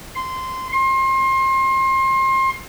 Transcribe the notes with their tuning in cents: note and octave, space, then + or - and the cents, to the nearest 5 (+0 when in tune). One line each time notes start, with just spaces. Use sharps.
C6 -15
C6 +30